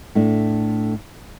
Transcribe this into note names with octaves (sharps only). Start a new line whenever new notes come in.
A2 A3 D4